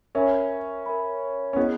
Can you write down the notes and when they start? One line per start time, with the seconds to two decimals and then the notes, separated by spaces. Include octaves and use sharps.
0.15 C#4 A#4 E5 G#5 B5
0.86 A#4 E5 G#5 B5
1.53 C#4
1.56 B3 E4 G#4 D#5